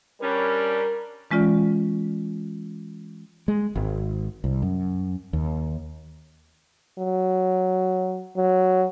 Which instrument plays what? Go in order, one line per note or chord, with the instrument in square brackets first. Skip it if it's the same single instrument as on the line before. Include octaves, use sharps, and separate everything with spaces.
[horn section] G3 C#4 D4 [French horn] A#4
[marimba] E3 G#3 C#4 F4 D5
[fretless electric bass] G#3
G#1
C2
F#2
D#2
[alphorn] F#3
F#3